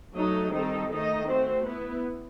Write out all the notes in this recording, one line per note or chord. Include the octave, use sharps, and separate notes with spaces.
F#3 A3 D#4 A4 D#5
D#3 G3 C4 D#4 A4
D#3 A3 D#4 A4 D#5
A3 C4 F#4 C5
B3 E4 B4